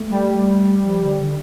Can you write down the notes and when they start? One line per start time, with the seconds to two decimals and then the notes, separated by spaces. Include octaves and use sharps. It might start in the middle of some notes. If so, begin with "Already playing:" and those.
Already playing: A3
0.10 G3
0.83 F3
1.01 D3
1.19 D3